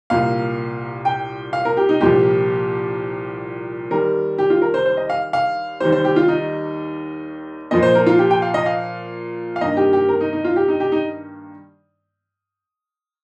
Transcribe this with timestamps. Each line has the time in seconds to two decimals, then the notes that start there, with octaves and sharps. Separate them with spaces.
0.10 C2 A#2 A#3 F5
1.05 G5
1.53 F5
1.65 A#4
1.77 G4
1.89 D#4
2.00 C2 A#2 F3 G4
3.91 D#2 D#3 G3 A#4
4.38 G4
4.50 F4
4.62 A#4
4.74 C5
4.86 C5
4.97 D#5
5.10 F5
5.33 F5
5.80 D#2 D#3 G3 C5
5.92 C5
6.05 G4
6.16 F4
6.28 D#4
7.71 A#2 F3 A#3 D#5
7.83 C5
7.95 A#4
8.06 F4
8.19 G4
8.31 G5
8.42 F5
8.54 D#5
8.66 F5
9.56 F5
9.61 G2 D#3 A#3 D#5
9.77 G4
9.93 G4
10.09 A#4
10.20 D#4
10.33 D#4
10.45 F4
10.56 G4
10.68 D#4
10.80 G4
10.92 D#4